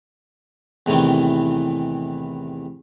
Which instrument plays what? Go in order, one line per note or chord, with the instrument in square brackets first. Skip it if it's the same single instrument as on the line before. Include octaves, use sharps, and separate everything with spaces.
[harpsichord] E2 A2 C3 D#3 E3